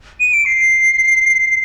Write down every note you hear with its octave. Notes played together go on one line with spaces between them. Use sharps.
D#7
D7
C7